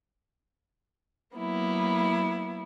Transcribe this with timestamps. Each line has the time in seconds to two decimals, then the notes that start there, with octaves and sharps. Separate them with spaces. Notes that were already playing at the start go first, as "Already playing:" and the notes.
1.35 F#3 A#3 B3 E4